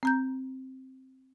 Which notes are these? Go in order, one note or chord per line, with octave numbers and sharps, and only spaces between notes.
C4 A#5 G6